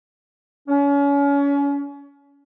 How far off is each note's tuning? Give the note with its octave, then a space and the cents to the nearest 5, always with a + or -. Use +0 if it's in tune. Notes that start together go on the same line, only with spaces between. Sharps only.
C#4 +35